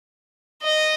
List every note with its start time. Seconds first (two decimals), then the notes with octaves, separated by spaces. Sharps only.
0.63 D#5